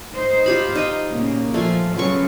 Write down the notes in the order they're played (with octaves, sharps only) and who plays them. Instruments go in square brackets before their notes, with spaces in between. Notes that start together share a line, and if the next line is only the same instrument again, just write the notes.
[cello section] D#4 C5
[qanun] F4 G4 B5
D#4 D#5 G5
[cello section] A#2 C#3 A#3
[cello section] F3 [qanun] A3 F4 G#5
[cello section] C#3 F#3 [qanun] B3 F4 C#6